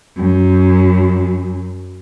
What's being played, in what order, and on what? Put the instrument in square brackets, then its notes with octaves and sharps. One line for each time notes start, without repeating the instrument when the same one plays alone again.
[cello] F#2